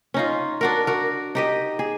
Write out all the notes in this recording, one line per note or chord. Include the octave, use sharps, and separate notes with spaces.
C#4 D#4 F4
D4 F#4 A#4
F#4 A#4
D#4 G4 D#5
G#4